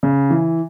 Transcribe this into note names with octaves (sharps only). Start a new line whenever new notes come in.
C#3
E3